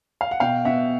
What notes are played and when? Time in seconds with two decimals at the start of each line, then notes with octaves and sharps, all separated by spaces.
0.21 F5
0.31 F#5
0.40 B2 F5 G5
0.65 B2 E5 F#5